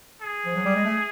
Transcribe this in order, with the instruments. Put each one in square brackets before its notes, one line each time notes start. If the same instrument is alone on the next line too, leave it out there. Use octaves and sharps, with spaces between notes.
[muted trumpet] G#4
[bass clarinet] F3
F#3
G3
G#3
A3